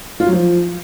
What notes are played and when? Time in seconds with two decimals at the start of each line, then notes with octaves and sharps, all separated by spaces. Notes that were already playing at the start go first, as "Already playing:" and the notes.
0.20 F4
0.26 F#3
0.33 F3